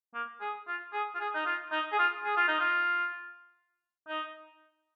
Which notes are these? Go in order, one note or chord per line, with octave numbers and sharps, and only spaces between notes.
A#3
G#4
F4
G#4
F4
G#4
D#4
F4
D#4
G#4
F4
G#4
F4
D#4
F4
D#4